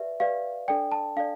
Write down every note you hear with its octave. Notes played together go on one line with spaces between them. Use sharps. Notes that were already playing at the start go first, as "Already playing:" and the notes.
Already playing: G4 B4 D5 E5
G4 B4 D5 F5
D4 A4 D5 G5
A5
D4 A4 D5 F5